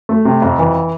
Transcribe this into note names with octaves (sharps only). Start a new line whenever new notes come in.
A3
C3
F2
E3